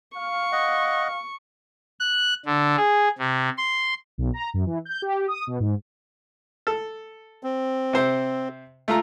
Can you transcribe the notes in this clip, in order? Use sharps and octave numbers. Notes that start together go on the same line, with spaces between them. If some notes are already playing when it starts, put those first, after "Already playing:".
F5 C#6
D#5 F#5
F#6
D3
G#4
C3
C6
B1
A#5
F#2
E3
G6
G4
D#6
B2
G#2
A4
C4
C3 C5
A3 F4 A#5